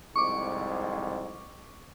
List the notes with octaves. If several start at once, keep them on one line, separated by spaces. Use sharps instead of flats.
C2 F2 G#2 C#6 D6